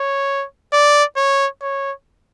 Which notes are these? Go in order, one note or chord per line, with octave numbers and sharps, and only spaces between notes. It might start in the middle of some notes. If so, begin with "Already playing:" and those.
Already playing: C#5
D5
C#5
C#5